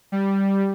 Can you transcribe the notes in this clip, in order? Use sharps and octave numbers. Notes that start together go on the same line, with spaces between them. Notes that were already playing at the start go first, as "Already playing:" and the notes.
G3